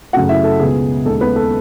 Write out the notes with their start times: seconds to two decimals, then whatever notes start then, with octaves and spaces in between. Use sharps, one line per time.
0.13 F#2 C#3 F#3 A3 F#4 F#5
0.29 E4 E5
0.44 A4
0.60 C#2 B2 G#3 B3 G#4
1.05 D#2 C#3 G#3 A4
1.21 B3 B4
1.36 A4